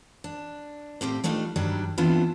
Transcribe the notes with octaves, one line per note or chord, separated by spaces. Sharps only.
D4
A2 C4 G4 F5
G3 A3 D4 D#4 F4
G2 D#3 F#3 G3 D4
E3 B3 C4 D4 E4 F4